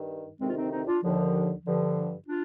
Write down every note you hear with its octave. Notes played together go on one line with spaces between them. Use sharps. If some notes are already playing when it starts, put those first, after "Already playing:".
Already playing: G2 D#3
D2 C3 D#3 G#3 C4
F4
C4 D#4
C4 D#4
D4 F4
D#2 D3 F3
G2 D3 F3
D4 F4